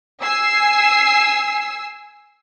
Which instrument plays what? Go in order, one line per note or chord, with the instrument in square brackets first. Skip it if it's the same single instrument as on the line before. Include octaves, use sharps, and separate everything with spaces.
[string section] G#5 E6 C7